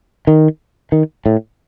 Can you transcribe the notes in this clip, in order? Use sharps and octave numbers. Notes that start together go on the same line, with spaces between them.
D#3
D#3
A2